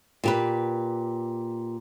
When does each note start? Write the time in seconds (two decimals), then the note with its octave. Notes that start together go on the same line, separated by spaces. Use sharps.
0.24 A#2 G4 B4